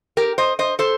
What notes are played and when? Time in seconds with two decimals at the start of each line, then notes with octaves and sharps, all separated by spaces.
0.17 G4 A#4
0.38 C5 D#5
0.59 C5 D#5
0.79 A4 C5